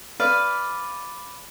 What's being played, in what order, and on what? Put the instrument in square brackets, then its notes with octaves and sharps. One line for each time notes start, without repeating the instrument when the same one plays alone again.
[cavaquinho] B4 D5 F5